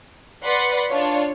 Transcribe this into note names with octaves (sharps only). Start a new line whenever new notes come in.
B4 D5 F#5 B5 C6
D4 F4 C#5